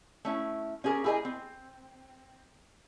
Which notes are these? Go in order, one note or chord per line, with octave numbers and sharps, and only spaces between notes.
A3 C#4 E4
C#4 G4 G#4 A#4
E4 G4 G#4 A#4 D#5 G#5
C4